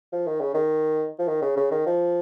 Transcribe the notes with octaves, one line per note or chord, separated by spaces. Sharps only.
F3
D#3
C#3
D#3
F3
D#3
C#3
C#3
D#3
F3